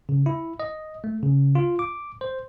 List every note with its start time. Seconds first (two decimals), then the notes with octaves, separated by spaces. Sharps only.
0.09 C#3
0.26 E4
0.60 D#5
1.04 A3
1.23 C#3
1.55 F4
1.79 D6
2.21 C5